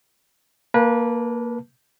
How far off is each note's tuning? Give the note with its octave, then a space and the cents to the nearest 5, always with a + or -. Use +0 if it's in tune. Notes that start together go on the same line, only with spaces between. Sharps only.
A#3 +0 B4 -25 A5 +0